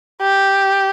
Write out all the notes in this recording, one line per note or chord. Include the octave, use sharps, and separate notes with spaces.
G4